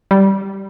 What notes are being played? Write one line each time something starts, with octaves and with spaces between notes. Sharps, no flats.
G3